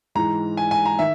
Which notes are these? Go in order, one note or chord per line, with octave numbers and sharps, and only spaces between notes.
G#2 E3 A#5
G#5
G#5
A#5
D#3 E5